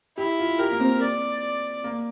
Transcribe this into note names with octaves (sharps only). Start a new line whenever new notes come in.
E4 G4
F4
G4 A#4
A#3
C4
D5
A#3